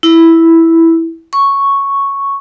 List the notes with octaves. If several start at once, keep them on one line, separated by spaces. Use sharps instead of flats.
E4
C#6